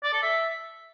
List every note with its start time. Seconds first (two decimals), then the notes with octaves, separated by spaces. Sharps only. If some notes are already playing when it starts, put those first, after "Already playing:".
0.03 D5
0.13 A4
0.23 E5